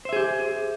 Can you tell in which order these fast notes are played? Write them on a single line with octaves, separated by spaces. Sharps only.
C5 E5 G#4 G4